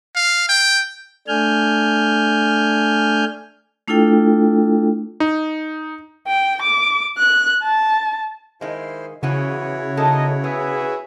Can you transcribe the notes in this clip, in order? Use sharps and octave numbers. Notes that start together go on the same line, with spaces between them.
F5
G5
A3 D4 G#5 F6 G6
A3 D4 E4 F4 A4 G5
D#4
G5
D6
F#6
A5
D#3 G#3 E4 C5 F5
C#3 E3 F3 B3 E4 F#4 C#5
A#3 C#4 D#4 A4 D#5
B3 G#4 B4 E5